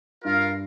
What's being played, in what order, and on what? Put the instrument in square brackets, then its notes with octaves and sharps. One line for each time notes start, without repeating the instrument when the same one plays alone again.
[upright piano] G2 [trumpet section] F4 A#4 F5